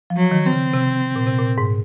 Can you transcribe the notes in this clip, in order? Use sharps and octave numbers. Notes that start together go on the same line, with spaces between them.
F3
F#3
D#3
C4
C#3
C3
A#2
C3
A#2
G#2